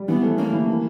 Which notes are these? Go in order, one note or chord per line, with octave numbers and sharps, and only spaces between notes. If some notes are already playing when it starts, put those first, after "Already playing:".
Already playing: G3
E3 B3
A3
A#3 C#4
E3
E3